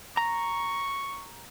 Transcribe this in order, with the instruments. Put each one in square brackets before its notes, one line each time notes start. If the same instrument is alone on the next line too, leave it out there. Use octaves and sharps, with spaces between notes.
[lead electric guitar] A#5 [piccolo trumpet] C#6